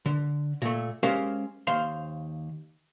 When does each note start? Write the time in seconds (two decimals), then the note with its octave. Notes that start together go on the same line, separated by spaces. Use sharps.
0.06 D3
0.62 A#2 A3
1.03 G#3 C#4 G4 A#4 C5 F5
1.67 D#2 C5 F5 C6